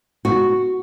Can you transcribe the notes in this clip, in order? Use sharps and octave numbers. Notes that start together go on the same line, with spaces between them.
F#4